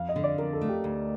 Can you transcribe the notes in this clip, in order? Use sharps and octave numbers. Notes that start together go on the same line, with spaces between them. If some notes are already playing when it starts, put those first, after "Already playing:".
Already playing: F2 F5
D#5
D3
D5
F2 A#4
A4
A3
G4
D2